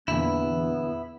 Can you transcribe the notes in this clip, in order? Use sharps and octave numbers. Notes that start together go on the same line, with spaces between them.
E2 A#2 D3 B3 E4